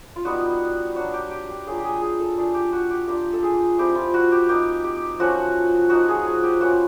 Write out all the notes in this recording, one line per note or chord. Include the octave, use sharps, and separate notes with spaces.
F4
G3 B3 D#4 F#4
F#3 A#3 D4 F#4
G4
G4
G4
F#3 A#3 D4 F4 G#4
G4
G#4
G#4
A4
A3 D4 F4 G#4
G4
F#4
G4
A#3 D4 F4 G4
A4
G#4
A3 C4 E4 G4
F4
F#4
G4
A#3 D#4 G4
G4
F3 A3 C#4 F#4
F3 A#3 D#4 F#4
G#4
G#4
G4
A#3 C#4 E4 F#4
F4